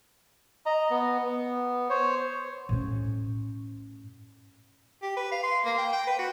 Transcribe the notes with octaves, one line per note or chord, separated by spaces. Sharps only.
D#5 A#5
B3
B3
C5 C#5
A2 C#4
G4
B4
F5
C6
A#3
G5
G5
B4
F#4